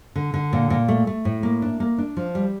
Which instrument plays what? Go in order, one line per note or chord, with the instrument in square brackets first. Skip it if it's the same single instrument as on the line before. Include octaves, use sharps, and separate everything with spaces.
[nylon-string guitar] D3
D3
A#2
A#2
A3
A3
A2
A#3
D4
A#3
D4
F3
G3